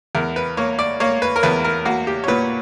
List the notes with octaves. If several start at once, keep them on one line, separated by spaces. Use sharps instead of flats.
E2 A#4
B4
A#3 C#5
D5
A#3 C#5
B4
A#4
E2 B4
A#4
A#3 F#4
G4
C#5
A#2 B4